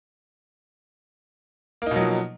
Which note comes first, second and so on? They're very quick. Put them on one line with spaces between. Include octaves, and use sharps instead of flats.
A#3 D#4 B2 F#3 F3